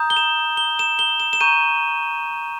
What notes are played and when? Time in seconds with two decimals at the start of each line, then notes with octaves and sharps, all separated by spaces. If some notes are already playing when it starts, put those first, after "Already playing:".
Already playing: A#5 D#6 G6
0.10 G7
0.17 E7
0.57 G7
0.79 E7
0.99 G7
1.20 E7
1.33 E7
1.41 A#5 C#6 G6 D#7